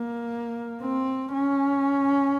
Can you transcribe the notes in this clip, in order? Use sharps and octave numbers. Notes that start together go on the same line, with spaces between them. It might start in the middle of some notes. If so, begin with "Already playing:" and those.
Already playing: A#3
C4
C#4